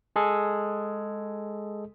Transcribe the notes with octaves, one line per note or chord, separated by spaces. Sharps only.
G#3 G#4 A4